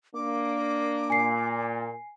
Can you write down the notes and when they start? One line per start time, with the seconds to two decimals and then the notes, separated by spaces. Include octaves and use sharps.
0.15 A#3 D4 D6
1.10 A#2 G#5 C7